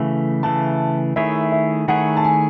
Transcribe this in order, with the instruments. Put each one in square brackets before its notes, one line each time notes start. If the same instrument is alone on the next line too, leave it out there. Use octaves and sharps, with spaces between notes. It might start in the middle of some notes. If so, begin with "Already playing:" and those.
Already playing: [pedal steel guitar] C#3 E3 A3
[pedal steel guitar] C#3 E3 A3 [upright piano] A5
[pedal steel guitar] D#3 A3 E4 G#4 C#5 [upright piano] E5
[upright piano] E5
[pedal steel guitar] D#3 A3 E4 G#4 C#5 [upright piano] F#5
[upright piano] A5
G#5